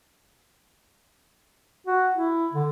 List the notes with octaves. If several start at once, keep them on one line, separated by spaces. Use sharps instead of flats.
F#4
E4
D3